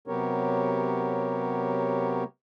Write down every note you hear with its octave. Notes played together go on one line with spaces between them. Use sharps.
C3 F#3 B3 G4 A#4 C#5